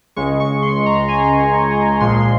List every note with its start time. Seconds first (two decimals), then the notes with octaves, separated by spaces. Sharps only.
0.16 C#2 C#3 G#3 C#6
0.40 C#6
0.62 C6
0.86 A#5
1.08 G#5
2.00 A#1 A#2 F3 G#3 C6